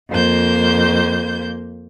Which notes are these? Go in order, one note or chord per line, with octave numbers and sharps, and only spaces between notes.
F2 A#3 C5 G6